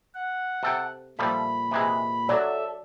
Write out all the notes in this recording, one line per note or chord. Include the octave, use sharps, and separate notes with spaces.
F#5
C3 A4 G5
A#2 F3 G3 A3 B5
C3 E3 G#3
F#3 A4 D5 E5